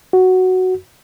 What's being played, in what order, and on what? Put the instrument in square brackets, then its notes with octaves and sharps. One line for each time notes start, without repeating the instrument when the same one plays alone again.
[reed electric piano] F#4